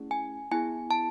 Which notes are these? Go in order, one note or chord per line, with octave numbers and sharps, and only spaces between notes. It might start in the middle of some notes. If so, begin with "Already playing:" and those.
Already playing: A3 C#4 E4 G#4
G#5
B3 E4 G#4 G#5
A5